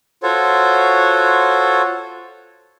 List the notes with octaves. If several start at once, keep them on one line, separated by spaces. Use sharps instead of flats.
F4 F#4 A4 C5 C#5